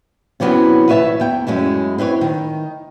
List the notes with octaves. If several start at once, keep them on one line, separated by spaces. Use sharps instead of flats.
C3 E3 F#3 G3 B3 C#4
B4 C#5 E5 G#5 A5
E2 G5
F#2 G#3 A3 E4
C4 E4 B4 C#5
D#3